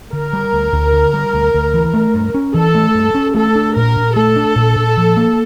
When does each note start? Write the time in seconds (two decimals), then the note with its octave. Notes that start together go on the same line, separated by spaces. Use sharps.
0.13 D3 A#4
0.33 G3
0.53 D2
0.72 D2
0.93 D3
1.14 G3
1.33 D2
1.54 D2
1.74 E3
1.94 A3
2.14 G2
2.34 C#4
2.54 E3 A4
2.75 A3
2.95 G2
3.15 C#4
3.35 A3 A4
3.55 D4
3.76 A#2 A#4
3.96 A#2
4.16 A3 A4
4.36 D4
4.55 A#2
4.76 A#2
4.97 F3
5.17 A#3